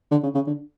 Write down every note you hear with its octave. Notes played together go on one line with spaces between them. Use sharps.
D3
C#3
C#3
D3